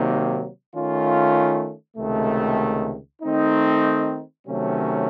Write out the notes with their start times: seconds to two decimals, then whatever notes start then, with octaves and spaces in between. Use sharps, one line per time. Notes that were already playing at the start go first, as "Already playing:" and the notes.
Already playing: C3 D#3 F#3 A#3 D#4
0.73 D#3 A3 C#4 F4
1.97 C#2 C3 D#3 A3
3.22 D#3 A3 C4 D#4
4.47 C3 D#3 F#3 A3 C#4